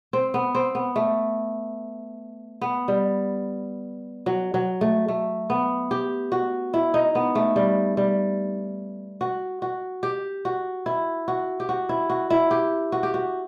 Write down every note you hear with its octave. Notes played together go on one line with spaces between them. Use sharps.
C4
B3
C4
B3
A3
B3
G3
F#3
F#3
A3
A3
B3
G4
F#4
E4
D#4
B3
A3
G3
G3
F#4
F#4
G4
F#4
E4
F#4
G4
F#4
E4
F#4
E4
G4
F#4
G4
F#4